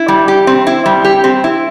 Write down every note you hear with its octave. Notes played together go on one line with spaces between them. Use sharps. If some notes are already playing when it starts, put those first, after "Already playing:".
Already playing: E4
G3
G4
C4
E4
G3
G4
C4
E4